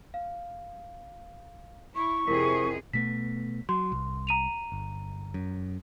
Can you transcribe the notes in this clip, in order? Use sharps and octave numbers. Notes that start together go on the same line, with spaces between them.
F5
E4 C#6
F2 C3 E4 G#4 A#4 B6
B2 A3 B3 B6
F#3 C6
C2
A#5 D#7 F7
G1
F#2